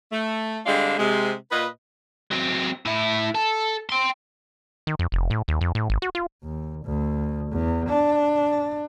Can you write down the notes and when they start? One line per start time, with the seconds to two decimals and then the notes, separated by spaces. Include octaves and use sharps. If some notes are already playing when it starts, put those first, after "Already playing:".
0.12 A3
0.66 D3 G3 G#3 C4 D4 F5
0.99 C3 G#3
1.51 A#2 B4 D#5
2.31 F#3 C4
2.85 A2 E4
3.35 A4
3.89 G5 C6
4.87 D#3
4.99 F2
5.12 F1
5.30 A2
5.48 D#2
5.61 F2
5.75 A2
5.90 G#1
6.02 F#4
6.15 F4
6.43 D#2
6.85 D2
7.51 E2
7.89 D4